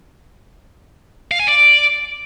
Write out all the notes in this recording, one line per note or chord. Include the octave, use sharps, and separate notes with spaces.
F5
G#5
D5